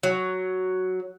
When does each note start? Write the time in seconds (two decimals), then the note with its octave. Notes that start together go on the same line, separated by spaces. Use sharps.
0.03 F#3